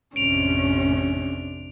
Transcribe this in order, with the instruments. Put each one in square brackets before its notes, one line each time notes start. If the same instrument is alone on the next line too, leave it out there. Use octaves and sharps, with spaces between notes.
[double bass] A1 F2 [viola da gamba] C3 D4 [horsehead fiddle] C#4 [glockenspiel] D7 F7